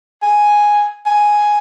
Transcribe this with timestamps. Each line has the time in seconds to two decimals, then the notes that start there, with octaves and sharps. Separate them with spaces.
0.23 G#5
1.06 G#5